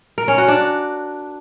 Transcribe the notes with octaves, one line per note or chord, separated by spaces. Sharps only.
A#4
C#4
F#4
D4